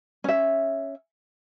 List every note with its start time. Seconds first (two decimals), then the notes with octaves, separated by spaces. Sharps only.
0.24 C#4 E5